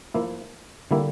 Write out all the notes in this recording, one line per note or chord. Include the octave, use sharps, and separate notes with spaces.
F3 A#3 E4
D3 G3 A#3 E4